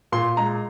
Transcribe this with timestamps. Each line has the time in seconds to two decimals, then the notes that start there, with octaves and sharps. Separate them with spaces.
0.12 A#2 C6
0.37 G#3 A#5